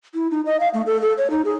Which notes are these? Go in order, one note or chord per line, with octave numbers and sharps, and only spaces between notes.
E4
D#4
D#5
F5
A3
A4
A4
C#5
D#4
G#4